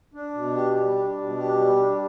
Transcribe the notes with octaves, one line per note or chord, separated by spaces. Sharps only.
D4
B2
G4
G3
D4
B2
G4
G3
D4